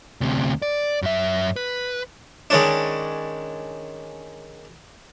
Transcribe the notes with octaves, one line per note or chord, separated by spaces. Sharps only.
D2 C3
D5
F#2 E5
B4
D#3 G#3 C#4 D4